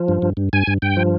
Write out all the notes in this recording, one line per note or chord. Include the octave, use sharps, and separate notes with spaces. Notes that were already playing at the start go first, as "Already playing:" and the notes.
Already playing: F3
G2
G2
G2
G2 G#5
G2
G2 G5
F3